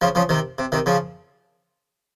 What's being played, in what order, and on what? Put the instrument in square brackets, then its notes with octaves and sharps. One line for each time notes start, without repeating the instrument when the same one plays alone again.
[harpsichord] C#3 F3
C#3 F3
C3 D#3
C3
C3 D#3
C#3 F3